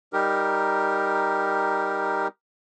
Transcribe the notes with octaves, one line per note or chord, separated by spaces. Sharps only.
G3 D#4 G4 A#4